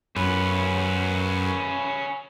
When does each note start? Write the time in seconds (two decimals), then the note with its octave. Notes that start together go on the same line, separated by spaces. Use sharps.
0.16 F#2 C#4 B4